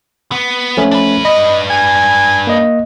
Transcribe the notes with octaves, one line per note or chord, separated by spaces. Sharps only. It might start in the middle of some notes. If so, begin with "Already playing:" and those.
B3
F3 A3 C#4
D4 B4
D#5 B5
G#5
A#3 D#5